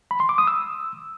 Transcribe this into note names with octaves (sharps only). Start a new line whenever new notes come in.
B5
C6
D6
D#6
E6